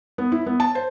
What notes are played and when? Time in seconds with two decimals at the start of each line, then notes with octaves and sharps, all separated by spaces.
0.18 B3
0.32 E4
0.46 B3
0.60 A5
0.75 C5